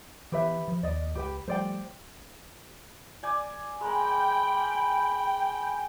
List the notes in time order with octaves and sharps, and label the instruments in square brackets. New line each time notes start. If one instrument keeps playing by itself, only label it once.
[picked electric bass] E3 B3 [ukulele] G4 B4 E5
[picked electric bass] F3
[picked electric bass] D#2 [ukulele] D5 D#5
[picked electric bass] C#2 [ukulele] G4 B4 G5
[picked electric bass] F3 G3 A3 [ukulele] C5 D5 G5
[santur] D5 G#5 D6
[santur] G#3 A#4 [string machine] G5 [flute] B5